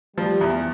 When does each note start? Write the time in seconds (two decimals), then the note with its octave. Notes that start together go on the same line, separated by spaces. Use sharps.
0.17 F3 G3
0.41 E2